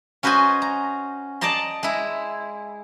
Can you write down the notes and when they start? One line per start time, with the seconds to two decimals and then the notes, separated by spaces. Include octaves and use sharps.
0.23 C#4 F#4 B4 C5 D#5 G#5
0.62 A#5
1.41 D5 D#5 A5 A#5 C6
1.83 G#3 E4